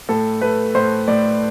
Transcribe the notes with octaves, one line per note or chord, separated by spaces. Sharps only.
A2 A4
A3 B4
A2 C5
A2 D5